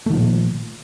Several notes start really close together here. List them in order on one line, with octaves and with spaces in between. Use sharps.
A3 D#3 F3 A#2